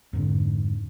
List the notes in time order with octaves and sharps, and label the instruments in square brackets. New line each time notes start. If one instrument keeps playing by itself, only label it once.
[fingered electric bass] F2 G#2 D3